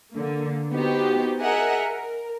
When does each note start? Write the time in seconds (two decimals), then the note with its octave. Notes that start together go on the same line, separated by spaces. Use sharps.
0.13 D3 A#3
0.72 B3 D#4 F#4 G4 C5
1.40 G#4 A#4 D#5 E5 F#5
1.88 A#4